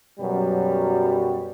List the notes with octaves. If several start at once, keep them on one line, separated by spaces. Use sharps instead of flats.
F#2 B2 F#3 G3